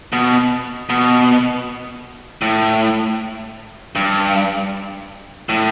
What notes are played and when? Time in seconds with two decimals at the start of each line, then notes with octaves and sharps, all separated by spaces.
0.13 B2
0.90 B2
2.42 A2
3.95 G2
5.49 A2